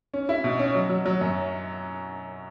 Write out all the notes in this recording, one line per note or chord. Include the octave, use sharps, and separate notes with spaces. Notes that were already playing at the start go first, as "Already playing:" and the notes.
C#4
E4
B2
C#4
F#3
F#3
F#3
F#2